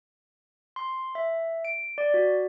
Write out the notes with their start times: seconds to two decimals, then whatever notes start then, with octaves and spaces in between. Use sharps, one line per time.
0.76 C6
1.15 E5
1.65 D7
1.98 D5
2.14 F#4